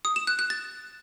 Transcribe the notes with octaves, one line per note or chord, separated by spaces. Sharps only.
D#6
E7
F#6
F#6
A6